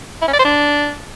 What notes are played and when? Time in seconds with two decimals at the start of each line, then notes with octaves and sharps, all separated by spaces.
0.22 E4
0.27 C#4
0.33 D5
0.39 C5
0.45 D4